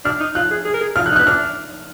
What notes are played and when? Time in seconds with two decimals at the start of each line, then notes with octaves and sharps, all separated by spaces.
0.05 D4 F6
0.20 D#4
0.35 F4 F#6
0.51 G#4
0.65 G#4
0.74 A#4
0.81 G#4
0.96 F4 F6
1.06 F#6
1.12 D#4
1.16 F#6
1.19 B3
1.27 D4 F6